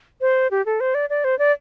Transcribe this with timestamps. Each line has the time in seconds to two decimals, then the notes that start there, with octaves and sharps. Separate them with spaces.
0.21 C5
0.51 G4
0.66 A4
0.80 C5
0.95 D5
1.10 D5
1.24 C5
1.39 D5